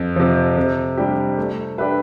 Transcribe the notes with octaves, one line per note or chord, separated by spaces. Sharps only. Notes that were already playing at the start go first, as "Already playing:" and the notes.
Already playing: F2
C3 F3
C3
G3 D4 G4
A3
D4 G4 B4 E5